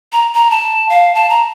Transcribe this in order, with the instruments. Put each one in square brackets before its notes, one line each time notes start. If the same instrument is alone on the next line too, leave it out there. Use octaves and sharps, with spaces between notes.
[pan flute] A#5
A#5
A5
F5
A5
A#5